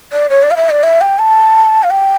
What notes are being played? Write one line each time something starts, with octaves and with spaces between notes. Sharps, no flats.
D5
C#5
D5
F5
E5
D5
E5
G5
A5
F5
G5